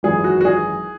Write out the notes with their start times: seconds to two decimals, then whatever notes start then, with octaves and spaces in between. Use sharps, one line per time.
0.03 G#1 F#2 E3 G#4
0.24 F#4
0.41 F#4
0.45 G#4